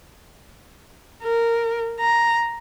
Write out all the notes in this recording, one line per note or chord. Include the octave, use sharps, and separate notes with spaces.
A#4
A#5